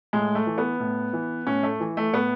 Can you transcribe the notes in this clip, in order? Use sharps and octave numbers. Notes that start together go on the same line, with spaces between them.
A2 G#3
A3
E3
B3
A2
E3
A2 C#4
A3
E3
A3
A2 B3